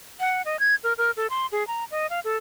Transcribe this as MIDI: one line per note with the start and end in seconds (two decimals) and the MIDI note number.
0.20 0.42 78
0.45 0.59 75
0.60 0.75 92
0.84 0.93 70
0.98 1.11 70
1.17 1.27 69
1.30 1.46 84
1.52 1.66 68
1.67 1.84 82
1.91 2.07 75
2.10 2.20 77
2.24 2.37 69